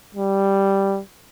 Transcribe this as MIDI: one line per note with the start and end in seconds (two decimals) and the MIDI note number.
0.15 1.01 55